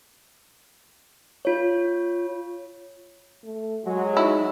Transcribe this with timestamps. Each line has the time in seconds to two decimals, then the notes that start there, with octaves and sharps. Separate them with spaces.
1.45 F4 C#5
3.44 A3
3.85 F#3 G#3 F#4
4.17 D#4 E4